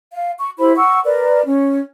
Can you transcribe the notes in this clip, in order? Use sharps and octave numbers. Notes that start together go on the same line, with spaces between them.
F5
C#6
E4 G4 C5 B5
F#5 C#6 E6
A#4 B4 D5
C#4